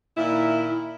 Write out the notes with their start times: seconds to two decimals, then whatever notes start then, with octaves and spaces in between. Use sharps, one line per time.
0.17 A#2 D#3 E4